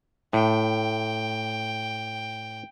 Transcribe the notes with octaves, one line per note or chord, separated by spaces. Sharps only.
A2 G5